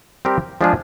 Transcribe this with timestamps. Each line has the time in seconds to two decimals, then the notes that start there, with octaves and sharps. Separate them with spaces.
0.25 G3 C4 G4 A#4
0.61 F3 G#3 D4 F4 G#4